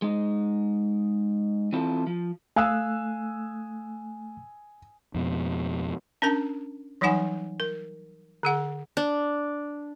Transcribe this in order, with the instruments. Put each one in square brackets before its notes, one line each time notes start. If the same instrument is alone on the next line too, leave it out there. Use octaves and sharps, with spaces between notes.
[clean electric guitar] G#3 D#4
E3 C4 E4 F4 A4
F3
[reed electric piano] A3 F#6 [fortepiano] F5 [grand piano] G#5 D#6 E6
[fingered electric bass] F2 B2
[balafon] C#4 D4 A#4 A5
E3 F#3 G3 D#4 F#5 G#5
A#4
D3 G#4 F#5
[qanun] D4